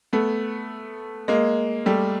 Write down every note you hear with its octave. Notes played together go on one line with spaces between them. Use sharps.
A3 B3
G#3 A#3
G3 A3